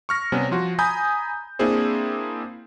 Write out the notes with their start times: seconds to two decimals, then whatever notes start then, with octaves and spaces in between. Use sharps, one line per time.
0.09 C#6 F6 A#6
0.32 C3 G3 B3 C#4
0.51 F3 F4 F#4
0.79 G#5 A#5 B5 D#6 G6
1.59 A#3 C4 D4 E4 G#4 C5